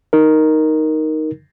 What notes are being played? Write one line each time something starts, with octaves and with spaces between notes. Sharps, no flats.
D#4 A#4